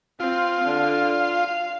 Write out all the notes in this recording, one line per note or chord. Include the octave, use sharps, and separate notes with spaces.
C4 F4
D3
F5